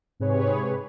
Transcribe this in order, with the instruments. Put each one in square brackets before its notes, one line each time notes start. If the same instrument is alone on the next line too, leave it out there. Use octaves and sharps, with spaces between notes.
[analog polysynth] G#2 C3 G#4 B4 C#5